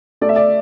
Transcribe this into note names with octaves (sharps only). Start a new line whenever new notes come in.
A3 D5
E5
D5